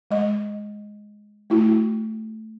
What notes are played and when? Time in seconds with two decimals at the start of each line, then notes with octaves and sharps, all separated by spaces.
0.11 G#3 D#5
1.50 A3 E4 F#4